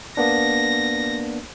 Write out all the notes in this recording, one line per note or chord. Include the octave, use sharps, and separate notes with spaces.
A#3 B3 D4 A#6